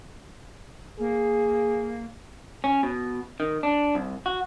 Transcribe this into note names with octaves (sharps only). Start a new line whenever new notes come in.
A#3 G#4
C#4
B2
D#3
D4
C2
F#4